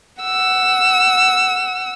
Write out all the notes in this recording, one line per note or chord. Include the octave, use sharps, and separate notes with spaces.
F#5 E6